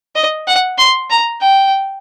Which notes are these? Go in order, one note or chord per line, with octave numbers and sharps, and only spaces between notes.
D#5
F#5
C6
A#5
G5